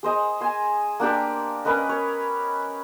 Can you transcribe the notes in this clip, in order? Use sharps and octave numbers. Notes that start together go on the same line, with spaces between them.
G#4 C5 D#5
G#5 C6
A#3 D4 G4 A#4
C#4 A#4 B4 D#5
C#5